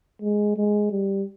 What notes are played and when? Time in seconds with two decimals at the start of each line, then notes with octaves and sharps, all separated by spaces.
0.22 G#3
0.57 G#3
0.92 G3